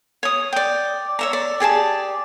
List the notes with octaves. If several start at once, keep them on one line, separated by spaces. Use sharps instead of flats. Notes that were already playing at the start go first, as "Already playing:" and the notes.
C#5 D#6
D5 G5
C#5 E5 A#5
D5
G4 G#4 D5 A5